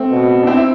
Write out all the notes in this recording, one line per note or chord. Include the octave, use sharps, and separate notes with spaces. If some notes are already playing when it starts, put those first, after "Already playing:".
Already playing: A3 C4
B2
D4
C4 E4
E4